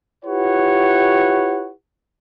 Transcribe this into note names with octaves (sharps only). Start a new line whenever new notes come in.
E4 F4 G4 B4 C#5 F#5